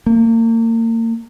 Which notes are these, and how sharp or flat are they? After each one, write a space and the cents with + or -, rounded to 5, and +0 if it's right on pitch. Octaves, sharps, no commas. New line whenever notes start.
A#3 -35